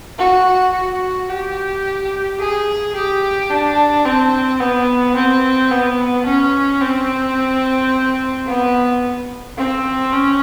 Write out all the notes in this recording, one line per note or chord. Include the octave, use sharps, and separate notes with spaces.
F#4
F#4
G4
G#4
G4
D4
C4
B3
C4
B3
C#4
C4
B3
C4
C#4